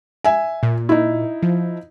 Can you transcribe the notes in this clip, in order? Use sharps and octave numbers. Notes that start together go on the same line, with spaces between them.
E5 G#5
A#2
D#4 E4
F3